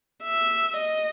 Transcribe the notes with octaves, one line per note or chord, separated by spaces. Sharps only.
E5
D#5